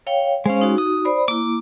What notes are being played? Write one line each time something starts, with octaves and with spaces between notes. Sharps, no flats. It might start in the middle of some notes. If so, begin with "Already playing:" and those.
C#5 F5 G5
G#3 C#4 C5 F5
D#4 F#4
D#6
C5 D5 B5
A#3 E4 D6